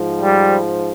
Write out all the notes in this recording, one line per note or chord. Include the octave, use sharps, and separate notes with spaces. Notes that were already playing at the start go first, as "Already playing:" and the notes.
Already playing: G#2 F3
G3